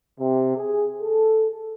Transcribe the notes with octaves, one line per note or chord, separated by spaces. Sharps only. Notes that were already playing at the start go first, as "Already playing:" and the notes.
C3
G#4
A4